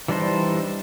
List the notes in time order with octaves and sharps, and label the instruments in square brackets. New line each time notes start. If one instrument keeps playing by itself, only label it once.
[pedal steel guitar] E3 G3 D4 D#4 C5